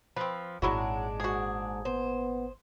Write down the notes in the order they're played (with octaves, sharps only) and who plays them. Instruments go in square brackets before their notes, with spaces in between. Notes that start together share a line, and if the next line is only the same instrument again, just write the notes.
[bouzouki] F3 [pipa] C4 B4
[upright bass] G#1 A#2 [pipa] F#3 E4 F#4 [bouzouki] G#3 D4
[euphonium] G#2 [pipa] F#4 G#4
[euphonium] B3 [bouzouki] C5